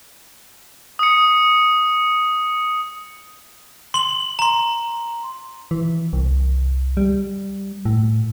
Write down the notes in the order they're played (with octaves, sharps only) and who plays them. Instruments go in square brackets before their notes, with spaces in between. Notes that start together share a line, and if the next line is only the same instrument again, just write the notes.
[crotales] D#6 C#7
[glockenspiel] C6 F#7
A#5 C6
[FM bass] E3
C2
G3
A2